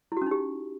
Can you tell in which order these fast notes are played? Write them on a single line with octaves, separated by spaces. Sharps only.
E4 F#4 C#4 D#4 G4